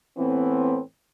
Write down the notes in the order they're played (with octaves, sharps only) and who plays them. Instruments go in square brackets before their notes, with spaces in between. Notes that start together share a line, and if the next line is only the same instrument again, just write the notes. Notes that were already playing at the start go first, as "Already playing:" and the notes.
[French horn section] A2 E3 B3 C4